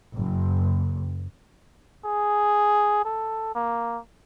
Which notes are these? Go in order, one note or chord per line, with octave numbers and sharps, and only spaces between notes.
F#1
G#4
A4
A#3